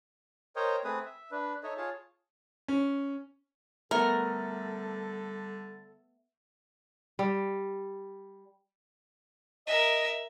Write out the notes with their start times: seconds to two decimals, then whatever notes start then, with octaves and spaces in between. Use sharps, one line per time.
0.56 A#4 C5 C#5 D#5 G5
0.84 A3 C4 G#4 B4 D#6
1.05 E5
1.31 D4 B4
1.63 D#4 A4 C#5 D#5 E5
1.77 F4 G#4 C#5 A5
2.68 C#4
3.91 D3 G3 A3 B3 A4 A#4
7.19 G3
9.67 A#4 D#5 E5